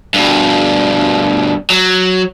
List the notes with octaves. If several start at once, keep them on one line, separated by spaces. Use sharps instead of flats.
G2 B2
F#3